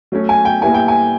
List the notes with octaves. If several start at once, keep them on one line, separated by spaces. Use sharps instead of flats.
F#3 A3 C#4
G#5
G5
A#2 G3 B3 E4 G#5
G5
G#5